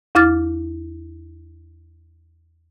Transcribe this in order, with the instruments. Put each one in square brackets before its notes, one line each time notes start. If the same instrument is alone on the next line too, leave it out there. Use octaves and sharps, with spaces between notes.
[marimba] E2 E4 D6 F6 A6